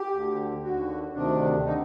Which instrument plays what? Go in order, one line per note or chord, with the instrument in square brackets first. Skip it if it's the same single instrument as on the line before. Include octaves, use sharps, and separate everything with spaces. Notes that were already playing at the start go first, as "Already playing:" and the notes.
Already playing: [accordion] G4
D2 D3
D#2 D3 F#4
D2 C3 D#3 D4
D3 D#4